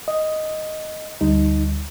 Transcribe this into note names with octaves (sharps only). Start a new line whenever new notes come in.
D#5
D2 G3 D#4